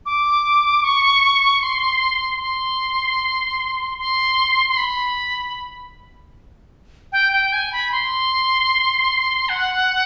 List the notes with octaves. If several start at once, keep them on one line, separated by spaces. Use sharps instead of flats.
D6
C#6
C6
C6
C6
C6
B5
G5
G5
G#5
B5
C6
F#5